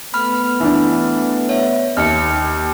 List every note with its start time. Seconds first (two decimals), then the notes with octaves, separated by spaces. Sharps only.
0.14 A3 B3 B5 F6
0.60 E3 D4
1.49 C#5 E5
1.97 D#2 F6 C#7